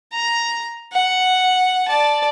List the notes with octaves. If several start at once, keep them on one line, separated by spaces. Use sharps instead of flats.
A#5
F#5
D5 A5